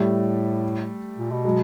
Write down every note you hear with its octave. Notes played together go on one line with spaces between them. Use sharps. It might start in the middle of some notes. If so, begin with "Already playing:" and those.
Already playing: A2 G3 A3
A#2
B2
F#3 G#3